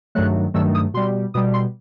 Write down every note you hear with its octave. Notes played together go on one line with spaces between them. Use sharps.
G2 D#3 F#3 A3 F#6
G2 D#3 F#3 A3 E6
D#6
B2 G3 C6
B2 G3 D#6
C6